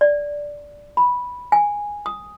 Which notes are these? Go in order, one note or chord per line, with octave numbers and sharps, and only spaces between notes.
D5
B5
G#5
D#6